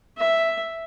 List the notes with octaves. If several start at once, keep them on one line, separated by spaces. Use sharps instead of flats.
E5